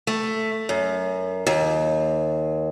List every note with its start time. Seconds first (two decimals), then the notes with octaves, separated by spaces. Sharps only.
0.07 A3
0.69 F#2
1.47 D#2